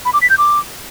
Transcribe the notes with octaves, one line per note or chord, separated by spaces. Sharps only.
B5
D6
B6
G6
D6